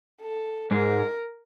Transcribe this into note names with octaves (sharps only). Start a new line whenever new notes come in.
A4
G#2 G#3 A#4